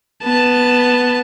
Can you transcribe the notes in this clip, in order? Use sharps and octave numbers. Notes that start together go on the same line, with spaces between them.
B3 A5